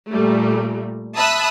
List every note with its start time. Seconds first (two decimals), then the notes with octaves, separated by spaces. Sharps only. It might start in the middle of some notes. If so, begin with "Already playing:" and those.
0.10 A#2 G3 A3
1.14 E5 A5 B5 D#6 E6 F#6